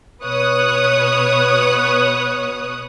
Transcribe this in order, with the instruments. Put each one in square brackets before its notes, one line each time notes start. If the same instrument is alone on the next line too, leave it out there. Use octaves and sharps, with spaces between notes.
[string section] B2 B4 C#5 C#6 D#6 F#6